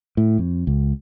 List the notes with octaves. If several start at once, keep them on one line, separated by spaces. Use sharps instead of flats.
A2
F2
C#2